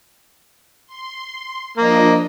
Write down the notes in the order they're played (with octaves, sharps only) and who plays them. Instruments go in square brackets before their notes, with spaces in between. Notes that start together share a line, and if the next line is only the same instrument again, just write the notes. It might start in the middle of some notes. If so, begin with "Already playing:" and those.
[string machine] C6
[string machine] F3 D4 D#5 [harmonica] A#3